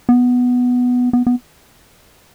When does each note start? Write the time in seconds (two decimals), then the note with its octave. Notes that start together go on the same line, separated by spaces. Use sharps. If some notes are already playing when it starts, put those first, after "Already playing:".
0.09 B3
1.13 B3
1.27 B3